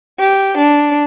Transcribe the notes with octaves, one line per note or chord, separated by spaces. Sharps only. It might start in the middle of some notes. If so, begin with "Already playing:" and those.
G4
D4